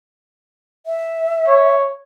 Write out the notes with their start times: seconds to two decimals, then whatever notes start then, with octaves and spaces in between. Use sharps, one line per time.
0.86 E5
1.47 C#5